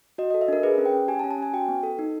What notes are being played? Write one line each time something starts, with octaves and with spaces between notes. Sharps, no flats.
F#4 D#5
D#5
A4
E5
D4 A#4
G#4 B4
C#4
G5
C#4
G4 G#5
A5
C#4
A5
C#4 G#5
F#4 G5
B3
A4
D#4